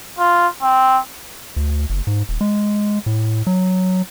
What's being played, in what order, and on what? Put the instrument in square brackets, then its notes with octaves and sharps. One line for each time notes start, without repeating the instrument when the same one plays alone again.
[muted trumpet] F4
C4
[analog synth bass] D2
F#1
G#2
D#1
G#3
A2
F#3